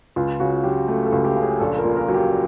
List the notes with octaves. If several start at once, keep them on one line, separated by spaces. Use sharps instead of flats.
C#2 F4
C#3 F#4
F#3 G4
A3 G4
A4
C#2
G4
C#3
G#4
A#1 A4
A#4
A#2
A#4
F#3
G4